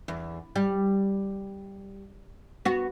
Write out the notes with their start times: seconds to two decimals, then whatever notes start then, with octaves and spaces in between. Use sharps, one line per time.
0.08 E2
0.56 G3
2.65 B3 F#4